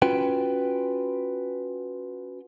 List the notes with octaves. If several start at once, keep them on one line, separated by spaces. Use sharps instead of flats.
C#4 F4 F#4 B4 G5